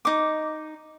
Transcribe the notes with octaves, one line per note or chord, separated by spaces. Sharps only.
D#4 D6